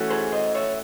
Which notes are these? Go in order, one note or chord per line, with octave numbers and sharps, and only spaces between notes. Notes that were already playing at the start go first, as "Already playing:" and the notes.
Already playing: E3 A3 C#4 F#4 A4
G#4 C5
C5 D#5
C#5 E5